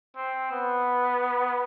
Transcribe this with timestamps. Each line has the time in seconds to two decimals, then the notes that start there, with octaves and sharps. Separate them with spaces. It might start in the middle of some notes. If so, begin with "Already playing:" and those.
0.16 C4
0.52 B3